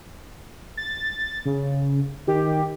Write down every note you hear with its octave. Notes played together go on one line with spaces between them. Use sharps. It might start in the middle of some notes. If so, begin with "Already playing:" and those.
A6
C#3
D#3 G4